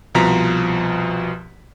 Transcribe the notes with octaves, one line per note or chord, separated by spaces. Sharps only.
C2 B2 F3 A#5 B6